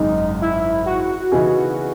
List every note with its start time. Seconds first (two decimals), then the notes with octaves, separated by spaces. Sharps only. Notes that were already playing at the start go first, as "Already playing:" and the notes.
Already playing: G#1 F#2 C#3 G#3 D#4
0.41 E4
0.85 F#4
1.32 C#3 E3 B3 D#4 G#4